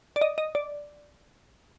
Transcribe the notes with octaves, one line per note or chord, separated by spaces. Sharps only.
D5
D#5
D#5
D5